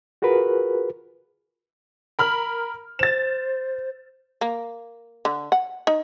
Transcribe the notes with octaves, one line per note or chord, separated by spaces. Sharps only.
F4 F#4 G#4 A#4 B4
A#4 B5 F6
C5 A6 E7
A#3
D3
F#5
D#4